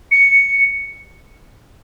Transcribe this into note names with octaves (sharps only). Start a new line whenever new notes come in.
C#7